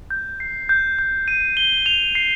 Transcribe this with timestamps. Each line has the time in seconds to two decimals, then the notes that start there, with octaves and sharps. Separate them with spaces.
0.11 G6
0.40 C7
0.69 G6
0.99 G6
1.28 D#7
1.57 G7
1.86 F7
2.15 C7